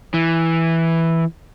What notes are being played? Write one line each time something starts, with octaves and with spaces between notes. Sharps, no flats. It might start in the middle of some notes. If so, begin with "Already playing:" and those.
E3